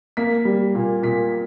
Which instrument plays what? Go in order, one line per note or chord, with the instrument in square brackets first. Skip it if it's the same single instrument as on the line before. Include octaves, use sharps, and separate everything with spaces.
[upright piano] A#3 B6
G3
A#2
A#2 B6